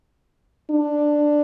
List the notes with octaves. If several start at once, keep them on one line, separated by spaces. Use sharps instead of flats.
D4